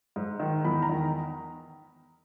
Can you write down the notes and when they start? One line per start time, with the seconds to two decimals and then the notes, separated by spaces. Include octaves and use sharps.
0.16 G#2
0.40 D#3
0.64 E2 B5
0.82 A#5
0.89 D#3